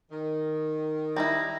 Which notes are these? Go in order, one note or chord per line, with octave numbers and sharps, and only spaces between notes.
D#3
G3 D#4 E4 A#5